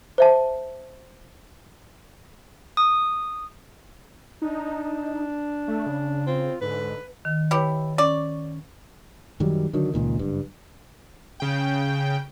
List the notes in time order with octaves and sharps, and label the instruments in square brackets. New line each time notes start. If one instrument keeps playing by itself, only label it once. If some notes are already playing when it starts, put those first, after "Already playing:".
[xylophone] C5 E5 A5
[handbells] D#6
[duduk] D4 [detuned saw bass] D#4
[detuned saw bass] A3
C#3
[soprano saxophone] C4 [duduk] F4
[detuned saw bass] G#2 [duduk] D3 [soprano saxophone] B4
[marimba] D#3
[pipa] E4 G4 [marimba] B4 C#5
[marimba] C#4 C#6 [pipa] D5
[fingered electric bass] F#2 D#3 F#3 G3
D3 D#3 F#3
C#2 A#2 D#3
F#1 G2
[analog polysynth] C#3 G5